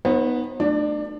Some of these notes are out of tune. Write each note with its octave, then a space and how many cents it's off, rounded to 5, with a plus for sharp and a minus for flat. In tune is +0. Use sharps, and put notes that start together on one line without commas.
B3 -10 D#4 +0 C5 +40
A3 +0 D4 +30 D5 +0